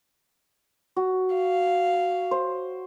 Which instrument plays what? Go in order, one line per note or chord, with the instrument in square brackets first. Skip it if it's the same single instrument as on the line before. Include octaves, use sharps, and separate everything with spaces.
[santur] F#4
[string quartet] F5
[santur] C5